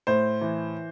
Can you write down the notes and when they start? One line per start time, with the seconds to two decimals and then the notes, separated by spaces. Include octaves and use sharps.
0.07 A2 C5
0.41 E3